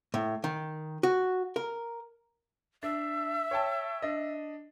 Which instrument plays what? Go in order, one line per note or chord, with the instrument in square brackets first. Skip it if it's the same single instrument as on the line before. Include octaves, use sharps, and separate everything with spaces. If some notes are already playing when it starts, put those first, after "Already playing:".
[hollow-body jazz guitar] A2
D#3
F#4
A#4
[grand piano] D4 [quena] E5
[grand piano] C#5 G5 A5
D4 D#5